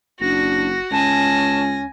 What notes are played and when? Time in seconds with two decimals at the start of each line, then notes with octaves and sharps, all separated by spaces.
0.20 F#1 D4 F#4 A#6
0.92 C#2 C#4 G#5 A5 A#6